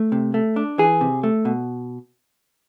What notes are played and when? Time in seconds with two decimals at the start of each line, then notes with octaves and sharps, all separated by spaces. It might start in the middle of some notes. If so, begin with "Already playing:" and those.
Already playing: A3
0.12 C3
0.34 A3
0.56 D4
0.78 E3 G#4
1.01 C3
1.23 A3
1.45 B2